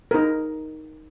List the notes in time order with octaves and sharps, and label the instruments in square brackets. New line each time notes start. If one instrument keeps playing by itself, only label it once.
[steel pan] D#4 A#4